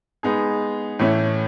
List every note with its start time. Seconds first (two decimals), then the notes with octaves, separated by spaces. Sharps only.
0.23 G#3 B3 D#4 G#4
0.99 A2 E3 A3 C#4